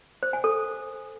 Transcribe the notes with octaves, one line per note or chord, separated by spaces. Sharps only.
C5
G#5
A4